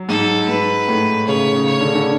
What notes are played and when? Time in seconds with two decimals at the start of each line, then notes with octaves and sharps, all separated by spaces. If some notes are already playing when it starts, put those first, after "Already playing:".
Already playing: F#3
0.09 G#2 A4
0.48 G#2 B4
0.88 A2
1.27 C#3 C#5
1.54 C#3
1.67 C#5
1.80 D3
1.88 C#3
1.95 D3